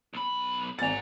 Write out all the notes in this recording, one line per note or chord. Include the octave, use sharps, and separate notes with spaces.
B1 B5
G#1 F#5 G#5 A#5 A6